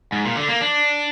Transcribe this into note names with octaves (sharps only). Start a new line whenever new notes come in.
G#2
A#2
D3
A#3
D4